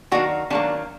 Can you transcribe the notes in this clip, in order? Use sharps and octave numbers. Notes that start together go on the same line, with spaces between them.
D#3 F#3 A#3 D4 F#4
D#3 F#3 A#3 D4